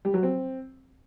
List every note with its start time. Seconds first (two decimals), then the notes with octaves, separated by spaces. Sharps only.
0.05 G3
0.14 F#3
0.23 C4